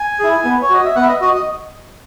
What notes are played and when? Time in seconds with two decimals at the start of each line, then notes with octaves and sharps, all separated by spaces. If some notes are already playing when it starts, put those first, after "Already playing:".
Already playing: G#5
0.19 E4 G#4
0.45 B3
0.62 C#5
0.70 F#4 D#5
0.84 E5
0.96 B3 F#5
1.03 E5
1.08 D#5
1.21 F#4 D#5
1.34 D#5